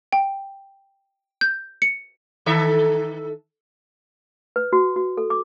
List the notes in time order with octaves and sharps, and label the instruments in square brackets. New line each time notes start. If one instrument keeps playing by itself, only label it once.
[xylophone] G5
G6
C#7
[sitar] D#3 A4 E5
[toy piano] B4
F#4
F#4
A4
D6